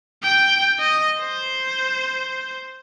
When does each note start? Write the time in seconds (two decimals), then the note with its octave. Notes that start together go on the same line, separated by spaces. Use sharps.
0.23 G5
0.79 D#5
1.20 C5